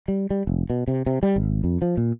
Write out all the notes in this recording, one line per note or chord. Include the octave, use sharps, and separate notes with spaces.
G3
G3
F1
B2
C3
C3
G3
G#1
F2
F3
A#2